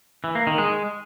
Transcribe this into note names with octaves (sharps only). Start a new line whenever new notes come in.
E3
A#3
D#3
G#3